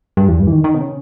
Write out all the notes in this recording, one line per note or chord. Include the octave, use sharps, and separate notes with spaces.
G2
E2
G2
E3
D#3
D#3
B2
C#3